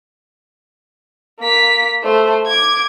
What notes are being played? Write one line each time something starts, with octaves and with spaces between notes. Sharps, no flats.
A#3 B6
A3 C5
D6 G#6